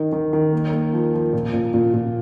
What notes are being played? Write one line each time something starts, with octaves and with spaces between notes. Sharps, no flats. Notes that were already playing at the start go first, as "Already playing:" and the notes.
Already playing: D#3 D#4
D#3
D#3
A#3
A#3
F3
F3
A#2
A#2
A#2
A#2